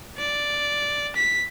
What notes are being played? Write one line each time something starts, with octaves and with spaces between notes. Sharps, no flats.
D5
B6